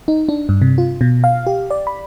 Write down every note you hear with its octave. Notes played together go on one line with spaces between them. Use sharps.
D#4
D4
G2
C3
F4
B2
F5
G4
D5
B5